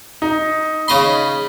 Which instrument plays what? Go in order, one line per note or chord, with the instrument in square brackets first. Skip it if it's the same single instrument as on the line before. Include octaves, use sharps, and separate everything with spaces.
[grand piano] D#4
[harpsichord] C#3 D#5 C6 [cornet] B5